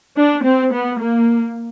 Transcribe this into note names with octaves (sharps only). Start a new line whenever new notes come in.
D4
C4
B3
A#3